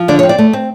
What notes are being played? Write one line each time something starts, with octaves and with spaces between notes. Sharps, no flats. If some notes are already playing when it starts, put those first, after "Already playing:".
Already playing: F3
D3 D5
C4 C#5
D5
A3
C4